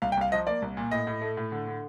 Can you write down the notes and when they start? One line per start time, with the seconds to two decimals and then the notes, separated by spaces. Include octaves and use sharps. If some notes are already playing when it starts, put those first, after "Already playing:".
0.02 C2 F5
0.12 G5
0.17 C2 F5
0.32 F3 D#5
0.47 A#3 D5
0.62 C2
0.77 A#2
0.91 A2 D#5
1.07 A2
1.21 A3
1.37 A2
1.52 D3
1.67 D3